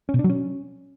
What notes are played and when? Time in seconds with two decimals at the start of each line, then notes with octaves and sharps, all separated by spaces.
0.09 C#4
0.14 B2
0.19 D4
0.24 F#3
0.30 C#4